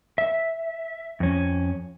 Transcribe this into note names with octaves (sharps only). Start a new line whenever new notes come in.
E5
F2 C#4